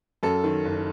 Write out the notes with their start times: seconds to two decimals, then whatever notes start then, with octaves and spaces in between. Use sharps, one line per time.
0.23 F#2 A4
0.44 D#3
0.65 F#1